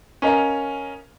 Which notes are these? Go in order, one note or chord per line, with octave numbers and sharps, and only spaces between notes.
C#4 A#4 D#5 F5 A#5